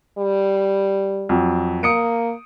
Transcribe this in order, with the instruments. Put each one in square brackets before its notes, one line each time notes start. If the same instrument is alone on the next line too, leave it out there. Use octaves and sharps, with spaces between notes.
[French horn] G3
[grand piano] F2 F#3
[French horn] A#3 [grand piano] D#6 C#7 D7